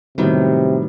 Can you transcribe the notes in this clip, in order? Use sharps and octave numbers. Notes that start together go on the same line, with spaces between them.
A2 C3 D#3 F#3 G3 B3